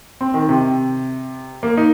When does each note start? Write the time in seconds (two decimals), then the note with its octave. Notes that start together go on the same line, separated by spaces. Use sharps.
0.21 C4
0.34 D#3
0.49 C3
1.63 A#3
1.77 D#4